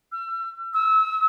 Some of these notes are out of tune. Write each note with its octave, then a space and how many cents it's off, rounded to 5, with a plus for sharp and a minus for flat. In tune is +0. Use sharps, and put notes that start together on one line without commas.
E6 +35
E6 -25